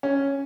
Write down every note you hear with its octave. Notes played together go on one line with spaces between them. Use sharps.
C#4